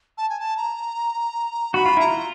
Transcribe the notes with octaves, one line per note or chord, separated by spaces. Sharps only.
A5
G#5
A5
A#5
F#4 B5
F4
E4 A#5
F4